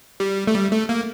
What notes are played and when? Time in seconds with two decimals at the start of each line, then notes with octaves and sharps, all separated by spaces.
0.20 G3
0.47 A3
0.55 G3
0.72 A3
0.89 A#3